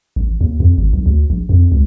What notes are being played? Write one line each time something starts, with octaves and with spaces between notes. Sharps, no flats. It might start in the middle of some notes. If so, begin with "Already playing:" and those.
A1
D#2
F2
G#1
B1
D2
A#1
F2
C#2